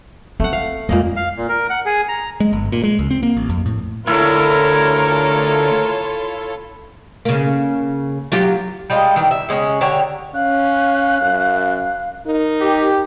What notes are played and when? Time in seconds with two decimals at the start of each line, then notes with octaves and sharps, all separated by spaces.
0.40 A3 C4 F#5
0.53 F5
0.89 F2 A#2 G#3 A#3 D#5
1.16 F5
1.37 A#2
1.49 A#4
1.70 F#5
1.86 G#4
2.09 A#5
2.40 G#3
2.53 G1
2.72 A#2
2.84 G#3
2.99 C#2
3.11 C4
3.23 A#3
3.37 A1
3.50 F2
3.66 A2
4.07 D2 E4 F4 A4 A#4 C#5
7.25 C#3 A#3
8.32 F#3 F4 G4
8.90 G3 G#3 F4 D#5
9.16 D#3 E3 G3
9.31 E5
9.49 C#3 G#3 B3 C#4
9.81 D3 G4 C#5 A#5
10.34 C#4 F5 F#6
11.21 F#2
12.26 D#4 A#4
12.60 G4